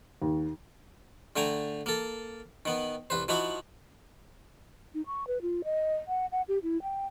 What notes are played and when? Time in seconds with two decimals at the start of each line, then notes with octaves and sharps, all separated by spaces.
0.22 D#2
1.36 D3 A3 G5 G#5 A#5
1.86 A#3 A4
2.65 D#3 B3
3.10 C2 B4 C5
3.28 F3 D#4 E4 F#4 B5
4.94 D#4
5.06 C#6
5.27 B4
5.42 F4
5.65 D#5
6.08 F#5
6.32 F#5
6.48 G4
6.63 E4
6.82 G5